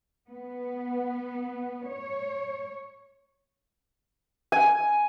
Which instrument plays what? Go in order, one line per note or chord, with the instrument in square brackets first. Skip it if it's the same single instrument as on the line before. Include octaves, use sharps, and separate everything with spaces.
[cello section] B3
C#5
[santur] G#5